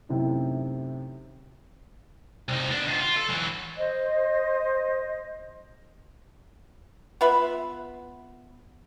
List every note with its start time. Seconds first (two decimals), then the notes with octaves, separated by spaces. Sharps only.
0.09 F#2 A2 C3 C4 D#4
2.48 C2 D#4
2.71 B3 D4
2.86 D#3 F4
3.00 F4
3.17 A4
3.29 E3 F#3
3.77 C5 D#5
7.21 B3 F4 B4 E5